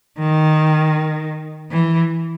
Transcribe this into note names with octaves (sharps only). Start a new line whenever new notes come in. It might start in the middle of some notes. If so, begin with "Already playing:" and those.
D#3
E3